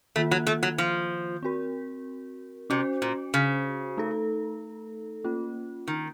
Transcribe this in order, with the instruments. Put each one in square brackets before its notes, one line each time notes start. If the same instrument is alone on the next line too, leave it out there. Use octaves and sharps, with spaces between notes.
[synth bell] D#3 A#3 F4 [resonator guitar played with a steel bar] A3
[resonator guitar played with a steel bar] F#3
A3
F#3
F3
[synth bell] C4 F#4 A#4
[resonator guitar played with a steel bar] C3 [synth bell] C#4 F#4 C5
[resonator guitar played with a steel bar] A#2
C#3
[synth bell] A3 D#4 A4
A#3 C#4 F4
[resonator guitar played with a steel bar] D#3